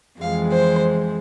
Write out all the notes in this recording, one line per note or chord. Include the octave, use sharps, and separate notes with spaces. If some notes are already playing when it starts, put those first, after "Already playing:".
F2 E3 G#3 F5
C5